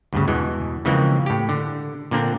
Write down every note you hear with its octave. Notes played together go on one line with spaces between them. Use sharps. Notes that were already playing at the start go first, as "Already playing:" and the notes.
D2 G2 C#3
E2 B2 E3 G#3
C#3 E3 F3 G#3 A#3 C4
A2 G4
D3
A#2 D3 A#3 C4 D4